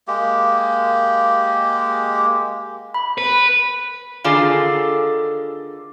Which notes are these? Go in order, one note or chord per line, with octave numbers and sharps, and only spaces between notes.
G#3 A#3 G4
B5
B4
D3 D#3 F4 G#4 A4 D5